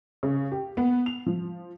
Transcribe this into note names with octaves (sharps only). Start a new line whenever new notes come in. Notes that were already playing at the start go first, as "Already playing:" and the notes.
C#3
G4
B3
F7
F3